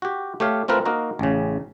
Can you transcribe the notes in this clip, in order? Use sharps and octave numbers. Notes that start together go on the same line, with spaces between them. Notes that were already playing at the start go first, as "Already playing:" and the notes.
F#4 G4
A3 G4 C#5 F5
A3 C4 F4 A#4 B4
A#3 D#4 F#4 A#4
A1 C#3